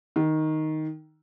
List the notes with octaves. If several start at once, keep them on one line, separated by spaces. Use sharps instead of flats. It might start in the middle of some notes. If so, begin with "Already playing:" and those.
D#3